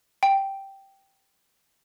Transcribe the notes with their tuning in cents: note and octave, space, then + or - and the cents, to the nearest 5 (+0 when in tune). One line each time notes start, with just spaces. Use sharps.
G5 -5